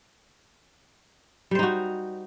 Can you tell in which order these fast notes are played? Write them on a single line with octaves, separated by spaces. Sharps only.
G3 C5 D#4 F#4